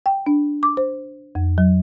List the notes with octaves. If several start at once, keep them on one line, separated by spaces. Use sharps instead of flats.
G5
D4
D6
C5
F2
F#3